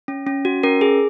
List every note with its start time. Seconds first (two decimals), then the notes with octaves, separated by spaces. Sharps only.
0.08 C#4
0.27 C#4
0.45 F#4
0.63 C#4 A#4
0.81 G#4